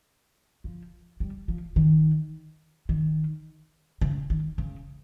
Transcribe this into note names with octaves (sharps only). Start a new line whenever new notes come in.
F3
G3
F3
D#3
D#3
C#3
D#3
C#3